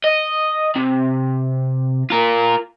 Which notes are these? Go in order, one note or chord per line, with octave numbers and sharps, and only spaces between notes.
D#5
C3
F4 A#4